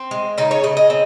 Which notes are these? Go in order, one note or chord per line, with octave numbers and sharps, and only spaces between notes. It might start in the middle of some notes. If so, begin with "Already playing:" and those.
Already playing: C4
G#3
C#3 D#4
C#5
C#3 D#5
D#5
C4